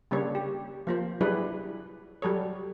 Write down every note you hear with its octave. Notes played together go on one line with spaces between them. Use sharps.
C#3 G3 A#3 D4 C#5
G4
F3 A#3 C5
F#3 G3 D4 E4 G#4 B4
F#3 G3 A4 C#5